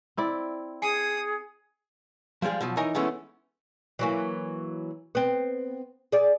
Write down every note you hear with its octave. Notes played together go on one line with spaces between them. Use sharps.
C4 E4 D5
G#4 G#5 D#6 C7 C#7
F3 G3 G#3 G#4 F5
B2 F3 F#3
E3 D#4 A#4 C#5 D#5 G#5
E3 G#3 A3 B3 C#4 E4
E3 F#3 A#3
B3 C4
G#4 D5